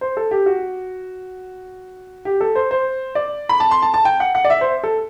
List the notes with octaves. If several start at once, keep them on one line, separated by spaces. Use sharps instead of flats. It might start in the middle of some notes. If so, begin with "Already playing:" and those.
C5
A4
G4
F#4
G4
A4
C5
C5
D5
B5
A5
C6
A5
A5
G5
F#5
F#5
D5
E5
C5
A4